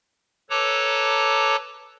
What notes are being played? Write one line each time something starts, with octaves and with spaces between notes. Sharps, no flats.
A4 B4 C#5 A5 A#5 D6